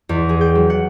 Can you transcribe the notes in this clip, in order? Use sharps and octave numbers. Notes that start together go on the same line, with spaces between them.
E2
G#4
G5
F#3
F#5